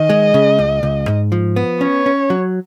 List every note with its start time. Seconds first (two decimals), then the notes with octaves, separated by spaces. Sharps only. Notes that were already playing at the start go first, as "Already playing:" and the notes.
Already playing: D#3 D#5
0.09 G#3
0.34 C#3
0.59 C#2
0.83 C#2
1.08 G#2
1.32 F3
1.56 B3
1.81 C#4 C#5
2.06 C#4
2.30 F#3